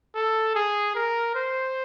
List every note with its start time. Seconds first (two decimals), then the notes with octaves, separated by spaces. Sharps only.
0.15 A4
0.55 G#4
0.95 A#4
1.35 C5